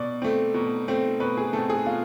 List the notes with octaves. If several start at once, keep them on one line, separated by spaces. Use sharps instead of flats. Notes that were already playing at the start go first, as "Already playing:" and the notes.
Already playing: B2 D5
A3 C4
B2
A3 C4
B2 B4
G#4
A3 C4 A4
G#4
B2 F4